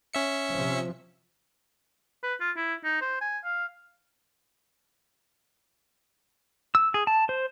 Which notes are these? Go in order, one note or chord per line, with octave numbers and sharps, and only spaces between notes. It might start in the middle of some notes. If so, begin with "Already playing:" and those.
C#4 E5 C#7
C3 F3
B4
F4
E4
D#4
C5
G#5
F5
E6
G#4
A5
C5